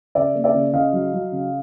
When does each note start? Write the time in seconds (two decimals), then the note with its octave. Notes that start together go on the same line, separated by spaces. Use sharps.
0.15 C#3 D5 E5
0.35 A#3
0.44 D5 E5
0.54 C#3
0.73 C#3 D#5 F5
0.93 F#3
1.13 F#3
1.32 C#3